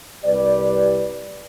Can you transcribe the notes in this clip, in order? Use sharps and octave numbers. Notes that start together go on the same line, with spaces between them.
C2 G4 B4 D5